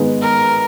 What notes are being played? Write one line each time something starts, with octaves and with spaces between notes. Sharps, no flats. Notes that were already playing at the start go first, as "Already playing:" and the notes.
Already playing: D#3 G#3 B3 D#4 G#4
A#4